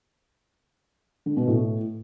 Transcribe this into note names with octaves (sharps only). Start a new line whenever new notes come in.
D3
B2
A2